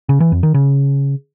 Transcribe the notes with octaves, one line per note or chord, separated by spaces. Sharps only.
C#3
E3
F2
D#3
C#3